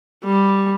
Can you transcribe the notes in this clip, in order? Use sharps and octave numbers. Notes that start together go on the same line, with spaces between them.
G3